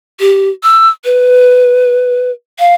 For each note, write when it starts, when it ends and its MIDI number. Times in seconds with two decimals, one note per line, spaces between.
0.20 0.50 67
0.63 0.90 88
1.05 2.31 71
2.59 2.75 77